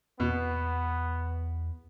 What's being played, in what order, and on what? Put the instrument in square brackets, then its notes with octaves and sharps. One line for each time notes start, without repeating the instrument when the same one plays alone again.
[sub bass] E2 [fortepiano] B2 [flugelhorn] B3